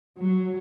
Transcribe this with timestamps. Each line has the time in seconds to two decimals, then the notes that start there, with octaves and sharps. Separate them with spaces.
0.19 F#3